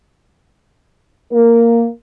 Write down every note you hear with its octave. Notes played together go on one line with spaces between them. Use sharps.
A#3 A#4